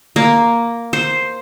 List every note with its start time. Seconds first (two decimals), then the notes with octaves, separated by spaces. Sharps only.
0.16 A#3
0.93 C5